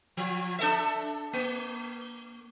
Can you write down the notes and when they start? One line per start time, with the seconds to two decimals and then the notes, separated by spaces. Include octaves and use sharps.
0.17 F3
0.59 D4 A4 E5
1.33 A#3